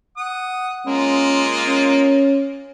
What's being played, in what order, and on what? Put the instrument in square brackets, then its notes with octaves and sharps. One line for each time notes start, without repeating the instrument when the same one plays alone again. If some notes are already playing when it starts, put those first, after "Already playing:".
[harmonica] F#5 D#6
[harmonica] G#3 A#3 F4 [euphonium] C#4
[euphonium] C#4